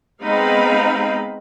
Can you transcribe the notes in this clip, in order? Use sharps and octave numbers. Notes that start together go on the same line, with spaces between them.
G#3 B3 C4 D#4 F5 B5